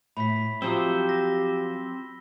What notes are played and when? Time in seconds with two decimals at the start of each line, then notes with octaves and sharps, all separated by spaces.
0.17 A2 B5 B6
0.62 F3 F#3 C4 G4 C5 D#6 E6 G7
1.09 A#6